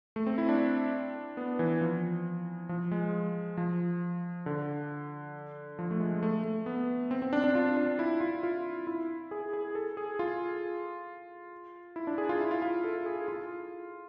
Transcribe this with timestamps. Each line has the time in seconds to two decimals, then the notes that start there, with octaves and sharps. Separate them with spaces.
0.16 A3
0.27 C4
0.38 E4
0.49 D4
1.37 B3
1.59 E3
1.81 F3
2.69 F3
2.91 G#3
3.57 F3
4.46 D3
5.79 F3
5.91 A3
6.00 G#3
6.23 A3
6.44 A3
6.66 B3
7.11 C4
7.22 C4
7.33 D4
7.44 D4
7.55 F4
7.77 D4
7.99 E4
8.21 F4
8.43 F4
8.87 E4
9.31 G#4
9.53 G#4
9.75 A4
9.97 G#4
10.19 F4
11.96 E4
12.07 D4
12.18 G#4
12.29 F4
12.40 E4
12.51 F4
12.62 F4
12.84 A4
13.06 G#4
13.28 F4